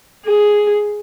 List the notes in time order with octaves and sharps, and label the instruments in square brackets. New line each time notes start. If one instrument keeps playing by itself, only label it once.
[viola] G#4